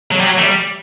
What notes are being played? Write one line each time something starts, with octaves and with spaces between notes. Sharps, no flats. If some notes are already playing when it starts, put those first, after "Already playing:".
F#3
G3
F#3
A3
G3